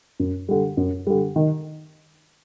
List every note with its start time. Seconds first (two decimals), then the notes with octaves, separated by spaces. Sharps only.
0.20 F#2
0.49 D3 G3
0.77 F#2
1.07 D3 G3
1.36 D#3